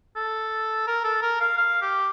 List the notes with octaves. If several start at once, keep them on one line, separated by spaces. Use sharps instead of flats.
A4
A#4
A4
A#4
F5
F5
G4